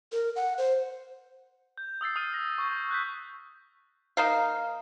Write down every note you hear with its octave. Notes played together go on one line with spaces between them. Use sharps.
A#4
F#5
C5
G6
D#6 E6 A6 C7
D#6 F6 D#7
A#6
C#6 G6
F#6 G6 B6
A#3 D#4 F5